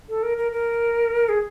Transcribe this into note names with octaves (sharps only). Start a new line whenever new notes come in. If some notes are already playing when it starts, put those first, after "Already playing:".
A4
A#4
A#4
A#4
G#4